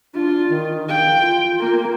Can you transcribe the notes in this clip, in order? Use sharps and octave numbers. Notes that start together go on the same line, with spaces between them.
D4 F4
D#3
F5 G5
F4
A#3